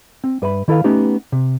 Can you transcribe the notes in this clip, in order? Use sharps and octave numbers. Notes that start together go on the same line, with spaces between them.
C4
G2 B4 E5 B5
D#3 E4 A4 B4 F5
A3 B3 C#4 D#4 G4
C3